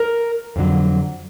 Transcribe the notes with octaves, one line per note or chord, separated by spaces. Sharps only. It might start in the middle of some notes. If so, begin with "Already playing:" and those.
Already playing: A#4
F2 D3 F#3